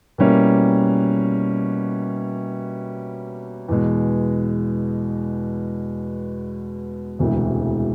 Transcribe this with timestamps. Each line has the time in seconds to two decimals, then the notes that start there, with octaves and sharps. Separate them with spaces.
0.18 B2 G3 A#3 C#4 E4
3.69 E2 B2 G#3
7.19 E1 D2 C3 E3 G#3